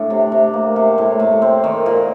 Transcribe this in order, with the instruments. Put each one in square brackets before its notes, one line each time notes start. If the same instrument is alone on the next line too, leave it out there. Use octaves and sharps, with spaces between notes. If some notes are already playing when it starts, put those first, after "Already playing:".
Already playing: [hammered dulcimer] A2 D4
C3
C3
A#3
C3
A2
A2
C4
D#3
A#2